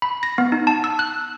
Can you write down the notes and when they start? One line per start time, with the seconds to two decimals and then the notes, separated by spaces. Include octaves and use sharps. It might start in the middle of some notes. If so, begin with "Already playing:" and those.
0.02 B5
0.23 A#6
0.38 B3
0.52 D#4
0.67 A5
0.84 E6
0.99 F#6